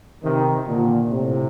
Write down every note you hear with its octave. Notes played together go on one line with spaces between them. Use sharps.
C3 D#3
A#2 D3
A2 C3